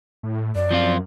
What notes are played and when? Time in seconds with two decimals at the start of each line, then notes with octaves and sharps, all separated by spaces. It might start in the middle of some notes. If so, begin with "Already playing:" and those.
0.23 A2
0.55 F#2 D5
0.71 F3 C4 F4